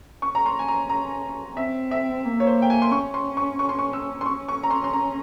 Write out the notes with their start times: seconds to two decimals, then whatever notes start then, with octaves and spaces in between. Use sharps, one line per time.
0.22 C#4 C#6
0.35 A#5
0.46 C6
0.59 G#5
0.68 A#5
0.89 A#5
1.57 C4 E5
1.91 E5
2.25 A#3
2.40 C#5
2.47 C5
2.62 G5
2.70 G#5
2.82 C6
2.92 C#4 C#6
3.14 C6
3.37 C#6
3.59 C#6
3.69 C6
3.79 C#6
3.93 E6
4.21 C6
4.26 C#4 C#6
4.49 C#6
4.63 A#5
4.71 C6
4.84 C6
4.93 A#5